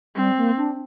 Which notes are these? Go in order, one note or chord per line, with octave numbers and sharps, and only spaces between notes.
G3 C4
A#3
D4